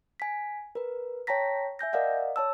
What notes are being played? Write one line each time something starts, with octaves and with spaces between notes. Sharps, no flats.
G#5 B6
A#4 B4
C#5 G5 A5 A#5 A#6 B6
E5 G#5 G6 A#6
A#4 D5 D#5 F5 F#5
C#5 A5 E6